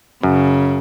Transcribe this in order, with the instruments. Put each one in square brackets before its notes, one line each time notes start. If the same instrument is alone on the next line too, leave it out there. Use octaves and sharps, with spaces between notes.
[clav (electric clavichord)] F#2 [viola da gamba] C#3